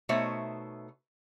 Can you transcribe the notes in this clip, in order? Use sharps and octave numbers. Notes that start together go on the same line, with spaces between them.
B2 A3 D#4 C5 C#5 E5